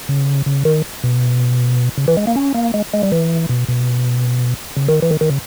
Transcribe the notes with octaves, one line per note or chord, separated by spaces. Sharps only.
C#3
C#3
D#3
B2
C#3
E3
G#3
A#3
C#4
A#3
G#3
G#3
G3
E3
B2
B2
C#3
D#3
E3
D#3
D#3
C#3